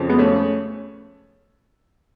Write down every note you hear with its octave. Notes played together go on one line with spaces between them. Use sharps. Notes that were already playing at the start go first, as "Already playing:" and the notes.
Already playing: F2 C#3 F3
G#3 B3
A3 C#4